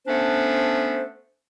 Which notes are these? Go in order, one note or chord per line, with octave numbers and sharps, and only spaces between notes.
A3 B3 C#4 D4 C5